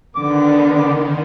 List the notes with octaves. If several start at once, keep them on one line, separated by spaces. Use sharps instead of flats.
D3 D#3 B3 D6